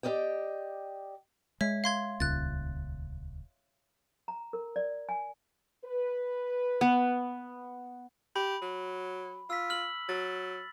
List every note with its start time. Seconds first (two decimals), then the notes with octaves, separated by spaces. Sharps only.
0.03 G4 A#4 D5 D#5 G5
1.61 G#3 C#5 E5
1.84 F5 C6 G#6
2.20 D#1 C#2 F#6 A6
4.28 A#5
4.53 A#4
4.76 D5
5.09 G#5
5.85 B4
6.81 B3
8.36 G4 B5
8.62 F#3
9.50 F4 E6 B6
9.70 F6 F#7
10.09 F#3 A6